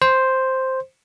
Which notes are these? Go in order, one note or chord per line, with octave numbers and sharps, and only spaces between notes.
C5